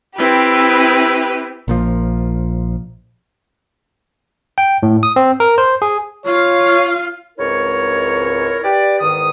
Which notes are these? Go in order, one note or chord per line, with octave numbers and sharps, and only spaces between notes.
C4 E4 G4 B4
A#1 A#2 F3
G5
A2
D#6
C4
A#4
C5
G#4
F4 C#5 F5
C#2 G#2 C4 E4 A#4 C#5
G4 B4 D5
E2 G#2 D#3 D#6